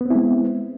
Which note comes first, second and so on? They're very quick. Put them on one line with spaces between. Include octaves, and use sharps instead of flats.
B3 C4 E4 G#3